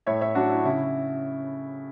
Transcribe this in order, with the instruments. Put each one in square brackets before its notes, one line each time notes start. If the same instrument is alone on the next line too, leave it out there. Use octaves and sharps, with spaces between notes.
[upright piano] A2 C#5 E5
C#5 E5
F#3 D4 F#4
E4
C#3 E4